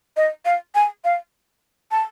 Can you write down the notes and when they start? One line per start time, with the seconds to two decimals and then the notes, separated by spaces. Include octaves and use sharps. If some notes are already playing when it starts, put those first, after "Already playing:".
0.17 D#5
0.45 F5
0.75 G#5
1.05 F5
1.91 A5